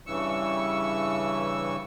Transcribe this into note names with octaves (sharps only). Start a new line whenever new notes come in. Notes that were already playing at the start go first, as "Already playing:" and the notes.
G2 C#3 E3 C#6 E6